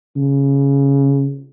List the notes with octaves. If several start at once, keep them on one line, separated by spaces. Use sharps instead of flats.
C#3